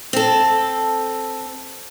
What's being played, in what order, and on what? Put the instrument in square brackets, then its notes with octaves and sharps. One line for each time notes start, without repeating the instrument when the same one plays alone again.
[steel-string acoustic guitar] C4 A4